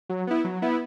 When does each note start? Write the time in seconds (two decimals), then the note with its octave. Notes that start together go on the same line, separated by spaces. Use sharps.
0.09 F#3
0.27 B3 E4
0.44 F#3
0.62 B3 E4